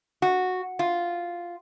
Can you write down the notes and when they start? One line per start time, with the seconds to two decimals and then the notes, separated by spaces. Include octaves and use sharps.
0.22 F#4
0.79 F4